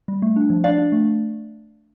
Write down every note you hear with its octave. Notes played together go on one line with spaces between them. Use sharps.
G3
A3
D4
F3
D4 D5 F5
D4
A3